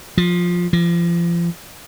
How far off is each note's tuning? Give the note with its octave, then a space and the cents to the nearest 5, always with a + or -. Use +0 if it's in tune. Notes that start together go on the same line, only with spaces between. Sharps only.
F3 +10
F3 -35